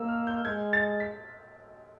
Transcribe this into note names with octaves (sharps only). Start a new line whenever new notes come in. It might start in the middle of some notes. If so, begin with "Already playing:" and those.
Already playing: A#3 E6
F6
G6
G#3 G#6
A6
B6